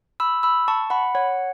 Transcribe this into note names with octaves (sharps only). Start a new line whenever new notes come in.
B5 E6
B5 E6
A5 C#6
F#5 B5
C#5 F#5